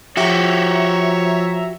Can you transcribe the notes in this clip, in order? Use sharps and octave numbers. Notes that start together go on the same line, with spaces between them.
F3 F#4 G4 C#5 E5 A#5